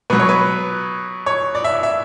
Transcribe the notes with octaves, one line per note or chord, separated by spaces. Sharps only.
B2 F#3 B4
C#5
B4
C#5
D5
E5
E5